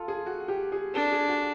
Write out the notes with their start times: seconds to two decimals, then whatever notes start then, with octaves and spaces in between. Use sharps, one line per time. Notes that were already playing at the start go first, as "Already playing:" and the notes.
Already playing: F4 A4
0.08 G#4
0.26 F#4
0.48 G4
0.72 G#4
0.94 D4 A4
1.12 G#4
1.28 F#4